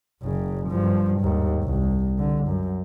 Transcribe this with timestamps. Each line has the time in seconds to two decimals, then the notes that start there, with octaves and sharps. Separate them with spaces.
0.22 F#1 C#3
0.69 G2 F3
1.21 D#2 G#2
1.64 C2
2.18 D3
2.47 F#2